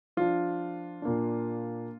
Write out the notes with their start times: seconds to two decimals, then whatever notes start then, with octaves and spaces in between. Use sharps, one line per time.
0.17 F3 D4 F4
1.02 A#2 A#3 D4